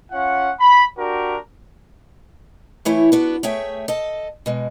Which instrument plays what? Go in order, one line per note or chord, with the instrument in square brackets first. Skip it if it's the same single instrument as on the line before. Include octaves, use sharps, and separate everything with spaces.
[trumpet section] C#4 F4 F#5
B5
D4 F#4 G4 A#4
[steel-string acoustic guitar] E3 A3 E4 C#5
B3 D4 F#4
A3 G#4 C#5 E5 G5
A4 D#5 A5
B2 G#3